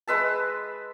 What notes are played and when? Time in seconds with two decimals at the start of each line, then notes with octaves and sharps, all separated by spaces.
0.07 G#3 B4 E5 A5